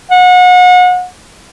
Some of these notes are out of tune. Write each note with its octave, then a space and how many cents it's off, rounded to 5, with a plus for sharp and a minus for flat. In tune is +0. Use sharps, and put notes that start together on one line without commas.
F#5 -35